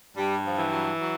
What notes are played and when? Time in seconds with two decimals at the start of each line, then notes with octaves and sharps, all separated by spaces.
0.16 G2 G3
0.45 F3
0.58 E3
0.72 F#3
1.00 F#3